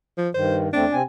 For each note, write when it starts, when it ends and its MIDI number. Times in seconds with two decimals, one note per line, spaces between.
0.18 0.30 53
0.35 0.69 43
0.35 0.69 51
0.35 0.59 72
0.73 0.85 40
0.73 0.85 57
0.73 0.85 60
0.73 0.96 62
0.92 1.02 48
0.92 1.02 60
0.92 1.02 80